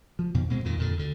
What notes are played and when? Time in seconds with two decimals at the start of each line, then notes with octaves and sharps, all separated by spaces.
0.19 F3
0.34 F2 B2 D#3
0.49 D2 B2 G#3 C4
0.64 F2 A#2 D#3
0.78 F2 A#2 D3
0.97 D2 D3